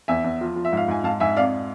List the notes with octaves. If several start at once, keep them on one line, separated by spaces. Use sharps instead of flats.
E2 E5 G#5
E2
F3
F3
E5
G#2 F5
G#2 G#5
G#2 F5 A5
G#2 E5 G#5
F2 D5 F5